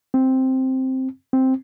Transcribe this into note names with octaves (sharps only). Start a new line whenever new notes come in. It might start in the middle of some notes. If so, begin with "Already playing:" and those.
C4
C4